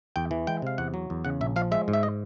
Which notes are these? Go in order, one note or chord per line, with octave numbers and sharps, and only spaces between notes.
E2 G5
E3
G#3 G5
C3 F5
E2 F#5
F#3
E2
C#3 F#5
A#1 E5
F3 F5
G#3 E5
G#2
E5
D#5